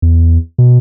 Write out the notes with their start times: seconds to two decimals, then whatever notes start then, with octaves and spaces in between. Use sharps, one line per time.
0.02 E2
0.58 B2